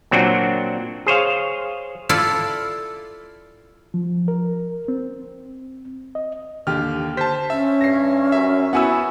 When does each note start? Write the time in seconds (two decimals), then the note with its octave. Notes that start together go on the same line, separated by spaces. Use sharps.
0.11 A#2 F#3 C4 D4 F#4
1.06 G#4 C5 C#5 F5
2.09 E4 F4 A4 D5
3.94 F3
4.28 A#4
4.88 C4
6.15 D#5
6.67 D#2 D3 G4 F6
7.17 C5 A5 B6
7.50 C#4 E5
7.81 G2 A#6 C7
8.32 F#2 E5
8.73 B3 E4 F#4 F#5 G#5 E6